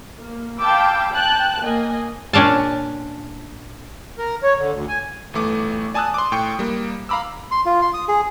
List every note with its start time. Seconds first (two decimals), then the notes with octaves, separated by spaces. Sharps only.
0.18 A#3
0.59 F5 G5 A5 B5 D6 E6
1.11 G5 A5 F#6
1.62 A#3 D#5 G#5
2.33 A#2 C#4 D4 F5 A5
4.19 A#4
4.43 C#5
4.57 D3
4.72 D2
4.89 G#5
5.34 G1 E3 A3 D6
5.94 D5 G#5 A5 D#6 E6 F#6
6.14 C6 D6
6.32 A2 G5 C#6 C#7
6.59 G3 A#3
7.09 F5 A#5 B5 D6 E6
7.51 C6
7.66 F4
7.82 C6
7.94 D#6
8.08 G#4